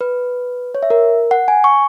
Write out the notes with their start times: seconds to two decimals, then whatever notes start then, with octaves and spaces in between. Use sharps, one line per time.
0.01 B4
0.75 C#5
0.83 E5
0.90 A#4
1.31 F#5
1.48 G#5
1.64 C#6